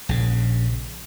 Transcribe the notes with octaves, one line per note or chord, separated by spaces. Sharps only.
A#1 C#3